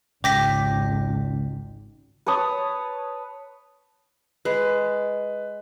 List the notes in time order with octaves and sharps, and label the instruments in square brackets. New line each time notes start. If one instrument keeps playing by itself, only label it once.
[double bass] G#1 [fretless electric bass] C#2 [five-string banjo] G4 [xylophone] D6 A#6 B6
[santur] B4 C#5 A5 D#6
[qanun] G#3 [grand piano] B4